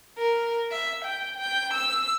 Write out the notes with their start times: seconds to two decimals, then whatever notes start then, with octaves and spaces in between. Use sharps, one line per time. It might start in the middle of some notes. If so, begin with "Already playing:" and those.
0.18 A#4
0.72 E5
1.05 G5
1.37 G5
1.74 E6